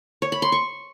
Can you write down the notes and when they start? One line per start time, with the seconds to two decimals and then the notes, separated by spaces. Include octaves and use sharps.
0.22 C#5
0.32 B5
0.42 C6
0.52 C#6